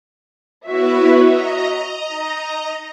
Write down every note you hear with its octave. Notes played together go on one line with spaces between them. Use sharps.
B3 E4 F#4 B4 C#5 E5
D#5 A#5
D#4